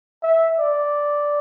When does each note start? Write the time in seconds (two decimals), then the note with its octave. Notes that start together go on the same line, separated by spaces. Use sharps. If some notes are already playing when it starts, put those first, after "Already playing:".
0.23 E5
0.59 D5